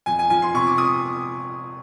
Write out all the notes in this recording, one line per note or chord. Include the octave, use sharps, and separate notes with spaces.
F2 G#5
G#5
F3 G#5
C6
C3 C#6
D6
D#6